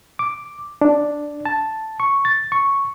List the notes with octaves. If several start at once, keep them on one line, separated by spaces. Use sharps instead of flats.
D6
D4
A5
C#6
A6
C#6